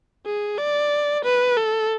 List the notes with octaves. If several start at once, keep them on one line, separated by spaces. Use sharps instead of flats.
G#4
D5
B4
A4